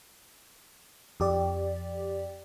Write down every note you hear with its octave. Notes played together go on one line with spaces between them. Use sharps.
F2 G4 D5